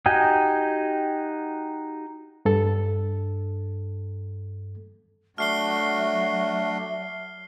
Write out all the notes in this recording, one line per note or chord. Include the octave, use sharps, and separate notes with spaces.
D#4 F#4 G4 G5 G#5
G2 A4
F#3 A3 D4 F#4 E5 F6 C7 G7